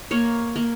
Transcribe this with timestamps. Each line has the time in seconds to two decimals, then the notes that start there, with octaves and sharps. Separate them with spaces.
0.11 A#3 C#5
0.56 A#3